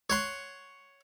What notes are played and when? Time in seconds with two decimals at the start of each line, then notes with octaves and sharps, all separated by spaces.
0.10 C#5 F#5 C6